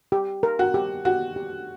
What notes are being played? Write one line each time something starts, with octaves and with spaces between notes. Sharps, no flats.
G4
A#4
F#4
G4
F#4 G4
G4